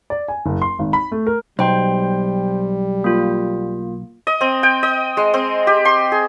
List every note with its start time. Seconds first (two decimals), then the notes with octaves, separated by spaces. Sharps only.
0.10 D5
0.28 G#5
0.46 F#1
0.62 C6
0.79 G#1
0.93 B5
1.12 A3
1.27 A#4
1.59 B1 G3 C5 G5 C6
3.04 A#3 F4
4.27 D#5
4.41 C4
4.63 G5
4.83 D#5
5.17 G#3
5.34 C4
5.67 G4
5.85 C6
6.12 G#4